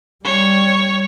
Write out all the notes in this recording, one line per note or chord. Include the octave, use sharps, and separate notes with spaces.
G3 C#5